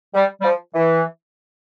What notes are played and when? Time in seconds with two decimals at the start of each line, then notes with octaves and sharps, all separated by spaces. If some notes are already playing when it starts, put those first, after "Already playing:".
0.15 G3
0.41 G3
0.44 F3
0.75 E3